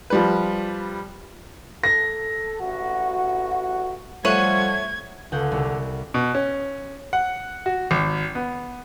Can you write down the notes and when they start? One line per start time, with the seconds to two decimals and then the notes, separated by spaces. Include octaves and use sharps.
0.10 F3 G3 B4
1.84 A4 A#6
2.60 A1 F#4
4.25 F3 G3 A3 C#5 F#5 G#6 D#7 F#7
5.32 C#2 D3 F#5 G6
5.52 C2
6.14 B2
6.35 C#4
7.13 F#5
7.66 F#4
7.91 G#1
8.35 B3